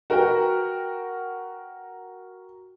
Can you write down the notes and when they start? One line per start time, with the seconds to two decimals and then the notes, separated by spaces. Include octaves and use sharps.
0.10 F#4 A#4 B4 F#5 G5